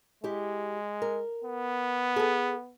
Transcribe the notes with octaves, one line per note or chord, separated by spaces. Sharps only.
G#3 E4 G4
A#4
B3
G#4 A4